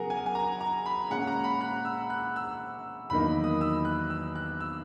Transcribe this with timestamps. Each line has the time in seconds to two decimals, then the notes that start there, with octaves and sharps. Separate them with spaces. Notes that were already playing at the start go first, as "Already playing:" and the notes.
Already playing: C#3 F#3 B3 G#4 A#4 F#5
0.10 G#5
0.26 G#5
0.35 A#5
0.61 A#5
0.86 B5
1.10 A#2 G#3 C#4 F#5
1.27 A#5
1.44 B5
1.61 F#6
1.85 E6
2.10 F#6
2.36 E6
3.10 E2 D#3 F#3 A#3 D#4 B5
3.44 D#6
3.61 E6
3.85 F#6
4.10 E6
4.35 F#6
4.60 E6